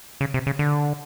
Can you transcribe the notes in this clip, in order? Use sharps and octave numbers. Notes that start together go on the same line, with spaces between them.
C#3
C3
C#3
D3